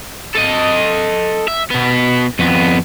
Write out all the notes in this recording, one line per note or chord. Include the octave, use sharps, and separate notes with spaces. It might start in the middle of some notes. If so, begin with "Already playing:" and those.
A4 D#5
E5
B2 B3
F2 B3